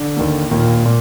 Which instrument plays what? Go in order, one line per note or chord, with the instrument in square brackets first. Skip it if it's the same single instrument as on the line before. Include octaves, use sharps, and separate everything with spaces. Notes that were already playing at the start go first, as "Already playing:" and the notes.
Already playing: [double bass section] D3
[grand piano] D#2 D#3 A#3
[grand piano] D#2 D#3 A#3 [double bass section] A#2
[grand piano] A#2